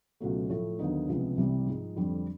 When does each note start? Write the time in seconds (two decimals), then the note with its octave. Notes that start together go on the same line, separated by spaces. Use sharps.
0.20 C#2 B2 F#3 A3
0.49 A2 F3 A3
0.79 D#2 D3 F#3 B3 D#4
1.09 C#2 C3 F3 G#3 B3
1.37 C2 C3 E3 G3
1.67 G#2 F3 G#3
1.96 F2 D3 G3 C4